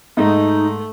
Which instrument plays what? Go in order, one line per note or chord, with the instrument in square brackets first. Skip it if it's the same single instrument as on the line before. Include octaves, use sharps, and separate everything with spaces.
[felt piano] G#2 [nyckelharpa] A3 [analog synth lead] D#4